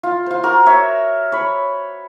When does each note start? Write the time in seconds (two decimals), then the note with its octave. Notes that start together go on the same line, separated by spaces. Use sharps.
0.03 F4
0.26 F4 C5
0.43 F#4 A#4
0.66 C#5 E5
1.32 C#5 B5